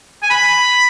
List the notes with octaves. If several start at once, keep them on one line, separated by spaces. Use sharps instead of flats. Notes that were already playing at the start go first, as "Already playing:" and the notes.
G#5
B5